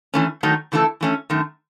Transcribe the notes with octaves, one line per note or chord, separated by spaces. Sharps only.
E3 A3 C#4
D#3 F#3 A3 D#4
C#3 E3 A3 E4 A4
E3 A3 C#4
F#2 D#3 A3